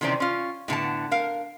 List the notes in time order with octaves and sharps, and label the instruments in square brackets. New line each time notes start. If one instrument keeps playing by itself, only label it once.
[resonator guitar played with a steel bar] C3 D#3 E3 C4 C#4 D5
C#4 F4
A2 D3 B3 A5
A#4 F5